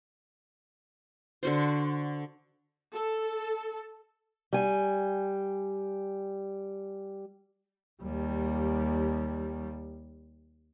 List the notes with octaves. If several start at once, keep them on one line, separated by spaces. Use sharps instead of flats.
D3 F#4 C5
A4
G3 G#5
D#2 G3